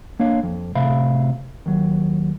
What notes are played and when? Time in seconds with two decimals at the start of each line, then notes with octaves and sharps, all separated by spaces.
0.19 A#3 D4 C#5 F5
0.43 F2
0.75 A2 C3 E5 F5 B5
1.66 D#2 F#3